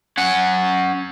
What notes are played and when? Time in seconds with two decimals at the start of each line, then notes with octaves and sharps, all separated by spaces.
0.18 C#4 F#5